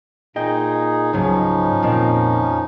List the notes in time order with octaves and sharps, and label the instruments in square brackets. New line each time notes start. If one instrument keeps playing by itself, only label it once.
[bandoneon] A#2 D#4 G#4 [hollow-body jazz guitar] D#5 G5
[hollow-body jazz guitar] C#2 G#2 F#3 [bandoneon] F3 C#4 D#4
[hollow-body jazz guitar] F2 A#2 D#3